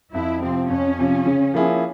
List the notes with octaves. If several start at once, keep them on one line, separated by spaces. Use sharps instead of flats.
F2 E4
C3 F3 C4
F2 C#4
C3 F3
C#3
F3 A#3 E4 G#4